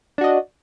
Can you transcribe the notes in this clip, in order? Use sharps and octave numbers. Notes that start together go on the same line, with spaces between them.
D4 F#4 D#5